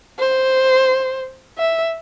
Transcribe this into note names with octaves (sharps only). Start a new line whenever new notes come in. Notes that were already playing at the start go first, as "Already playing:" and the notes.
C5
E5